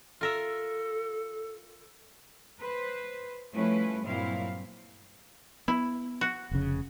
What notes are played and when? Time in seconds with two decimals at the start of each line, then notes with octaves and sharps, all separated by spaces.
0.21 F4 A4 A#4 E5
2.60 B4 C5
3.52 F3 G3 A3 C#4 E4 B4
4.06 G2 A#2 F#3 C4 E4 F5
5.68 B3 E4
6.21 F#4
6.51 F1 C#3